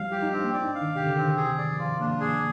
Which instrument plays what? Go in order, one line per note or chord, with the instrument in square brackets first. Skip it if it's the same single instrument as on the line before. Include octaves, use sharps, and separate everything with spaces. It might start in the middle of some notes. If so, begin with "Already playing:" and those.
Already playing: [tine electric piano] F3 G3 [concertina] F5
[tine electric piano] F4 [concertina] G4
[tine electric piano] D#4
[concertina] C4 [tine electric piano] D4
[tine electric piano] A#3
[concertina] D5
[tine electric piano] D#4
D4
[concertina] F5
[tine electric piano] D#3
[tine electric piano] C3 [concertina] G4
[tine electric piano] D3
[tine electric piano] D#3 [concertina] C4
[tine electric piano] D#3
[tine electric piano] C3 [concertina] G#4
[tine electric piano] D#3
[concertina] D5
[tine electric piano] F3
[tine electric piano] F3 [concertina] F4
[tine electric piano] A#3 [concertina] D4
[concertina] G#4